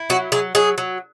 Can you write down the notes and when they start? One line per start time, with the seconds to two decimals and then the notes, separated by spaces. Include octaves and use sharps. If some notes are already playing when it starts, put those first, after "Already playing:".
Already playing: E4
0.10 F#3 F#4
0.32 F#3 G#4
0.55 F#3 G#4
0.78 F#3